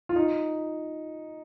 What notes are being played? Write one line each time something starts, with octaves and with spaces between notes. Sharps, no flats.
F4
D#4